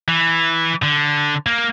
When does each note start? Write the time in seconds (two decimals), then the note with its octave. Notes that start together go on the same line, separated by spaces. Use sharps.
0.08 E3
0.83 D3
1.46 A#3